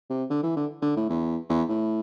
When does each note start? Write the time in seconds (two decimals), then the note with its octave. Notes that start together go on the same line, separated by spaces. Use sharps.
0.10 C3
0.30 D3
0.43 E3
0.56 D3
0.82 D3
0.96 A2
1.09 E2
1.49 E2
1.69 A2